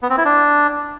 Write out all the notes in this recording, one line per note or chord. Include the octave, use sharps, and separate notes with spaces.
B3
C4
E4
D4